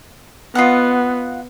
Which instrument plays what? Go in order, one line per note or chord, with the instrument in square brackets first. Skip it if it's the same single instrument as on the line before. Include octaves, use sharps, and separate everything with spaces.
[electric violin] B3 [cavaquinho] F4 D#5 F#5